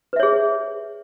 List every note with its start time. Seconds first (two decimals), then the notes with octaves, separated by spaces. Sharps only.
0.13 B4
0.16 E5
0.20 C#5
0.23 G#4